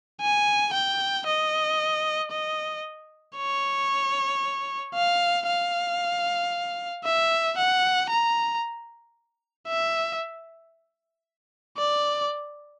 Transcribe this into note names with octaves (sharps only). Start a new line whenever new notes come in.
G#5
G5
D#5
D#5
C#5
F5
F5
E5
F#5
A#5
E5
D5